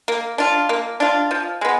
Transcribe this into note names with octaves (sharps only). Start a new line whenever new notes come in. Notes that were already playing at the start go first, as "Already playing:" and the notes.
A#3
D4 F4
A#3
D4 F4
F3
G#3 B3